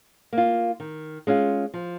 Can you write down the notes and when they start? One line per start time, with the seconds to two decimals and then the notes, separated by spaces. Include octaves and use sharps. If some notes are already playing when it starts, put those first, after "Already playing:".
0.33 A#3
0.38 F4
0.80 D#3
1.27 G#3 C#4 F4
1.74 F3